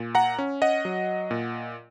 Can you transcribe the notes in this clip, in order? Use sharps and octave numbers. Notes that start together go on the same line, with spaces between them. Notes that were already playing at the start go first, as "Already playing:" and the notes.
Already playing: A#2
F#5 A#5
C#4
D#5 F#5
F#3
A#2